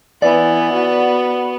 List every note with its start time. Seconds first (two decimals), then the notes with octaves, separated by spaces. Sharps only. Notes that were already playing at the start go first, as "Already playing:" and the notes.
0.22 E3 B3 D5
0.73 F#4